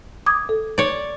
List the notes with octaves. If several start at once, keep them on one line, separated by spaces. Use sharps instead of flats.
D6 D#6 G#6
A4
C#5 D5